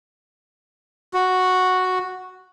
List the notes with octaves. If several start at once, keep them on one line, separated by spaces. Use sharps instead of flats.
F#4